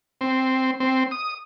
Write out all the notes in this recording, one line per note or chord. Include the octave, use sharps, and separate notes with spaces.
C4
C4
D#6